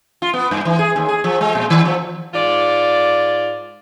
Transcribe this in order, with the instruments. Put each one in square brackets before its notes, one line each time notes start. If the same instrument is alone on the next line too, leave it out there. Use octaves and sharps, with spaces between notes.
[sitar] F4
B3
G2
E3
G#4
D#2
G#4
F3
G#3
A#2
D#3
F3
[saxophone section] G#2 F4 D5